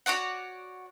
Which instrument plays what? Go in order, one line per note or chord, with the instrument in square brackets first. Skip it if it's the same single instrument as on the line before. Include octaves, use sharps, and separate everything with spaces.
[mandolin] F#4 C#5 D5 F#5